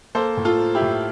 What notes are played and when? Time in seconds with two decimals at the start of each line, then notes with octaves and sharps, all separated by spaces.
0.15 A#3 A4 C5
0.37 A2
0.45 F4 A4
0.60 A#3
0.75 E4 G4
0.82 A2